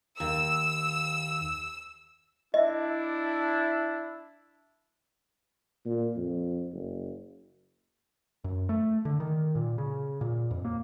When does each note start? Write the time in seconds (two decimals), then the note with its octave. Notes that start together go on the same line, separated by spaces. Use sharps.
0.20 D#2 E6
2.54 D4 E4 D#5 E5
5.86 A#2
6.16 F2
6.73 F#1
8.44 F#2
8.69 A3
9.05 D3
9.20 D#3
9.55 A#2
9.78 C#3
10.21 A#2
10.51 F2
10.64 A#3